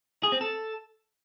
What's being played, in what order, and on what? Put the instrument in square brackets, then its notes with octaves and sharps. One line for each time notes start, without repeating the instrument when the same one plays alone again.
[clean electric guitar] G#4
C4
A4